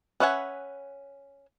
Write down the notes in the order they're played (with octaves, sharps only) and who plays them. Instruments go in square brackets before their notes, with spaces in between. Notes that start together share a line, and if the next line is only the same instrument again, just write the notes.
[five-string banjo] C#4 B4 E5 F#5 G#5